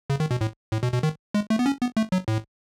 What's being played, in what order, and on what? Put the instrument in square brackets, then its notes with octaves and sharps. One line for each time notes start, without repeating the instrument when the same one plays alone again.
[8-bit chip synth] C#3
D#3
B2
A2
A2
B2
B2
D#3
G#3
A3
B3
C#4
B3
A3
F#3
A2